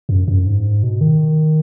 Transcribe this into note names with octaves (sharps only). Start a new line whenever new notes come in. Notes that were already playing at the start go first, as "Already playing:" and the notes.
F#2
F#2
G#2
B2
D#3